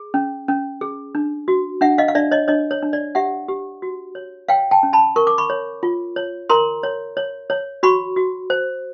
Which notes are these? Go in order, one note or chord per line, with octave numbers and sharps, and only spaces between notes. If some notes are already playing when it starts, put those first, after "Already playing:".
Already playing: G#4
C#4
C#4
G#4
D4
F#4
D4 E5 F#5
D#5 F5
F5
D4 D5 E5
C#5 D#5
D4 C#5 D#5
C#5
D4
D5
G4 E5 F#5
G4
F#4
C#5
C#5 F5 G5
G5 A5
C#4
A5 B5
A#4 C#6
D6
B5 C#6
C#5
F4
C#5
A#4 A#5 C6
C#5
C#5
C#5
F#4 B5 C#6
F#4
C5